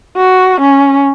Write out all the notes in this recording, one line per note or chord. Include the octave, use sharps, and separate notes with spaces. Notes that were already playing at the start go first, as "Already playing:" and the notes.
F#4
C#4